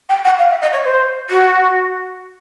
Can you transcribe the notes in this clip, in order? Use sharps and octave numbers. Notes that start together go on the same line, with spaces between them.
G5
F#5
F5
E5
D#5
C#5
C5
F#4